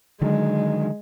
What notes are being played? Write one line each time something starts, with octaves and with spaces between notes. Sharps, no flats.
D3 D#3 F#3 G#3